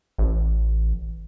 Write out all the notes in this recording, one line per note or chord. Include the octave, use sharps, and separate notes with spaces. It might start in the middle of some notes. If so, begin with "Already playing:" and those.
A1